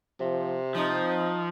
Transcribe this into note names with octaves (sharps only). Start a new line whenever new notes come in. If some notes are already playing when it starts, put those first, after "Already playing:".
C3 F3
F3 C4 D#4